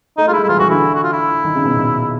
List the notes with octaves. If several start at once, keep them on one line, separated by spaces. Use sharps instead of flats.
A3 D#4
G#3 E4 F4
G3
E4
E3 F4
E3 F#4
D3 E4
F#4
F4
E4
D#3
C#3
B2
A#2